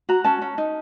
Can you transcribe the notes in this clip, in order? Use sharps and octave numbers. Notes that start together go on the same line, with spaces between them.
F#4 A#5
C#4 A5
C#4
D#4